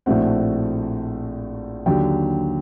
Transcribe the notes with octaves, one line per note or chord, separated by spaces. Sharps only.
A#1 A2 A3 C4 F#4 F#5
D#2 D3 F#3 G4 G5